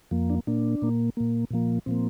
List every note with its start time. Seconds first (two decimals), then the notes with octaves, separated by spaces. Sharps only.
0.11 F2 F3 A#3
0.30 D4
0.47 A#2 A#3 D4
0.82 A#2 A#3
1.17 A#2 A#3
1.51 A#2 F3 A#3
1.86 A#2 F3 A#3 C4